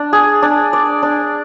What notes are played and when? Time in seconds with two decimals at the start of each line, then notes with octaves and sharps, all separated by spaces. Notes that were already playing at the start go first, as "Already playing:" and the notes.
Already playing: D4
0.13 G#4
0.42 D4
0.73 D5
1.03 D4